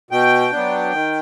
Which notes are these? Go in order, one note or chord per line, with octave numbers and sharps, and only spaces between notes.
B2 G5
F#3 B3 D4
D#3